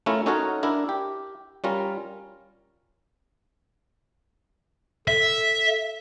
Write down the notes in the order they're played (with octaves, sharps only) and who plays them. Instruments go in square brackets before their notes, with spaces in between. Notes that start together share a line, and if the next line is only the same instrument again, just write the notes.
[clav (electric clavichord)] A3 C#4 E4 F4 A#4
C#4 D#4 F#4 A4 A#4 C#5
D4 E4 A#4
G4
G3 C#4 F4 A#4
[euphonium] A4 [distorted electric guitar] E5